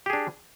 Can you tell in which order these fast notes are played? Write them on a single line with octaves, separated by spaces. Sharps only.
G4 G#4 D4